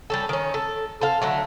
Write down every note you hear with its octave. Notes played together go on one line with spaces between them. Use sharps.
G3 C#4 A4
D#3 C#4
A4
A4 C5 F5
D3 F#3 A3